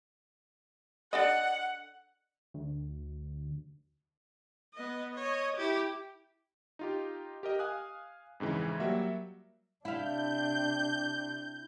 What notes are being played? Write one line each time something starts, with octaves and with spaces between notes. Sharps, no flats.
D4 A4 D#5 F#5
D2
B3 D#5
C#5 D#5
E4 G4
D#4 F4 G4
G4 A#4 D#5
F5 G#5 D#6 F#6
F2 G#2 C#3 E3
F#3 G3 A#3 F#4 E5
C3 D4 E4 F5 G6